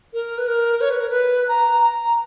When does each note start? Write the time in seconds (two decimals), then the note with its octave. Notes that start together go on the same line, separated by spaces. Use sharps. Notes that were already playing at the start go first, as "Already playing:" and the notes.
0.13 A#4
0.38 B4
0.47 A#4
0.81 C#5
0.90 B4
1.00 A#4
1.09 B4
1.48 A#5
1.82 A#5